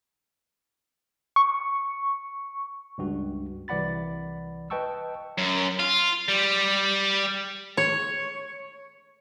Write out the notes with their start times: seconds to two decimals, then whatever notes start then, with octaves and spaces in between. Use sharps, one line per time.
1.36 C#6
2.98 C#2 G2 F#4
3.68 C2 E3 D5 F#5 B5 A6
4.70 B4 D#5 G5 A5 C#6 E6
5.38 F#2
5.79 F4
6.28 G3
7.77 C#5